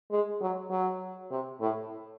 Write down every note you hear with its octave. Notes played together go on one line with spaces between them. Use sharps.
G#3
F#3
F#3
C3
A2